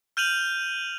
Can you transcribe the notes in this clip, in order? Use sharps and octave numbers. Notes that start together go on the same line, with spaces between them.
F6 G6 D#7 F7 F#7